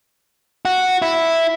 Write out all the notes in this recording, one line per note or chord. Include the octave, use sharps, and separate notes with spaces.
F#4
E4